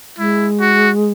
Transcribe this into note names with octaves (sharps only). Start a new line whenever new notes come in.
G#3 E4
F#4